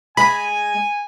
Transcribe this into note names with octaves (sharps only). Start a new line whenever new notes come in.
G#3 G#5 B5